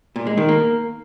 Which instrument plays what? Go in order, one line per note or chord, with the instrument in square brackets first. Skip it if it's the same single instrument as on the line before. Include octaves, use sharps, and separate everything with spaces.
[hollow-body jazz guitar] A#2
G#3
D#3
A#3